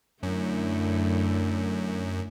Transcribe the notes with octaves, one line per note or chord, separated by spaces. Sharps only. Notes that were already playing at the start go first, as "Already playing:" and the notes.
F#2 D3 A3 E4